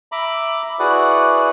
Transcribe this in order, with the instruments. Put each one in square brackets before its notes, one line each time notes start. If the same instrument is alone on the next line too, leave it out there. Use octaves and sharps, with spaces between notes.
[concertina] E5 A#5 B5 D6
E4 F#4 G#4 B4 D5 F#5